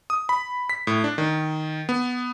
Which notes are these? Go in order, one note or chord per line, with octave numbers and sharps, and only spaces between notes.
D#6
B5
B6
A2
D4
D#3
B3